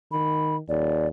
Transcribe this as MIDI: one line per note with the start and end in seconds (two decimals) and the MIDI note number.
0.12 0.59 51
0.12 0.56 83
0.69 1.07 39
0.69 1.08 74